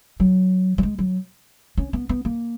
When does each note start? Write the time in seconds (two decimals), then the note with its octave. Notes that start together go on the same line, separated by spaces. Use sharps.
0.20 F#3
0.78 F#3
0.83 G#3
0.98 F#3
1.77 C#4
1.93 B3
2.09 B3
2.25 A#3